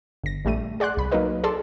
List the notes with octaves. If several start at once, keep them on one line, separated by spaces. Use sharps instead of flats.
G1 A#6
A#1 G3 A3 D#7
G#4 D5 F#5 C6 F#6
C2 B5
F#3 A#3 D#4 A#4 B4 D#5
G#4 A4 D5 A5 C6 E6